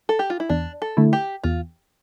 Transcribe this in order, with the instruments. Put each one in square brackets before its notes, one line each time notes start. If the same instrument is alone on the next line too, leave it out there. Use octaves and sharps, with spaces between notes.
[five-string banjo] A4
G4
F4
E4
[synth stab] E2 [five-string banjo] D4
[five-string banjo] A4
[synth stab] D3 A3 E4
[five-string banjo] G4
[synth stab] E2 [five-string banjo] F4